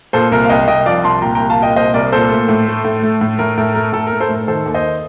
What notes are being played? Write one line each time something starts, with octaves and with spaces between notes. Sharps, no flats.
A#2 A4 C5
C2 A#4
F5
C2 D#5 G5
C2 D#5 G5
F3 D5 F5
C2 A5 C6
A#2 G5 A#5
C2 G5 A#5
F5 A5
A#2 D#5 G5
C2 C5 D#5
C2 A#4 D5
A#2 A4 C5
A3
A2
A3
A2
A3
A2
A2 A#4
A2 A#4
A3 A#4
A2 A4
A#4
A3
A4 C5
A2 A#4
D#3 A4 C5
D#2
C5 D#5